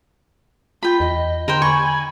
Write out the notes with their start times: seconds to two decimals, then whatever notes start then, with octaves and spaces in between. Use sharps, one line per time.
0.83 F4 G5 B5
1.00 E2 D#5
1.48 D3 A#4 C5 G5
1.62 G#5 B5 C#6